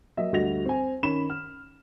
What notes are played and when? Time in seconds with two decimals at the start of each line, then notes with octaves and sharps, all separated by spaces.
0.17 F#3 A#3 D#5 E5
0.32 D2 G3 F#4 D#5 A#6 F7
0.66 C4 G#5
1.03 D#3 C#4 B5 E7
1.30 F6